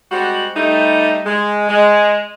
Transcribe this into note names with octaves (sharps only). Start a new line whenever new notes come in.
G3 G#3 C4 F#4
G3 A3 D#4
G#3
G#3